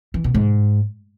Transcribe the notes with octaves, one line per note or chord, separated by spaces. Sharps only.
E3
B2
G#2